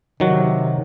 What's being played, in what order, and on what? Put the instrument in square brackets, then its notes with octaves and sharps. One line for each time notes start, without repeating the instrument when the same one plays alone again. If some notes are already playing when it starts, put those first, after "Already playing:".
[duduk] C3 [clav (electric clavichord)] D#3 F#3 F#4